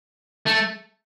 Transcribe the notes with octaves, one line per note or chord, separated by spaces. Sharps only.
A3